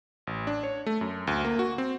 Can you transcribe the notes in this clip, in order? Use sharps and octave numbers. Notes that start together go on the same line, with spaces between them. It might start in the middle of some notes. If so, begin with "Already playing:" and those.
A1
D4
C#5
A3
F#2
D2
A#3
F#4
C4